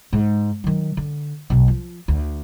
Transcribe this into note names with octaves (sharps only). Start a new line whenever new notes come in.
G#2
D#3 F#3
D3
B1 B2
F3
D2